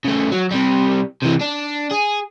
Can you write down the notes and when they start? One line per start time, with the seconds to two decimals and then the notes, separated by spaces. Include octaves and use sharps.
0.04 C#3 A3
0.31 F#3
0.51 C3 G3
1.22 C3 E3
1.41 D4
1.91 G#4